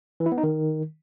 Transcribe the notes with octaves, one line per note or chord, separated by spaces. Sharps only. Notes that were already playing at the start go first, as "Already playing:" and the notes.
E3
E4
B3
D#4
D#3